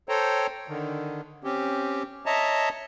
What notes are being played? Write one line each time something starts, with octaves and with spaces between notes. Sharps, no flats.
A4 C5 C#5 G5 A#5
D3 D#3
C4 C#4 G4
C#5 D#5 E5 A5 A#5